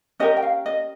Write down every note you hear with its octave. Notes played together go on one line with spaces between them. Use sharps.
C#4 G4 A#4 D#5
G5
F5
D#5